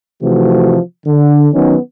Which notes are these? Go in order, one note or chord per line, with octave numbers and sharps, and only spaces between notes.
C3 E3 F3 A3 F#4
D3
D#3 F#3 B3 C#4 D#4